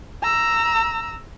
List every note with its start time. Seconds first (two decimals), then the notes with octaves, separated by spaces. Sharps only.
0.23 A#5 E6